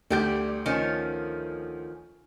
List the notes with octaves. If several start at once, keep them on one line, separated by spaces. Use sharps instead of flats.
D2 G3 G4 G6
D#3 F3 C#4